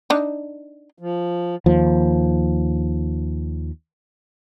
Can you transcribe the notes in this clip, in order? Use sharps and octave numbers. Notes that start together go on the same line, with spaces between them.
D4 D#4
F3
D#2 F3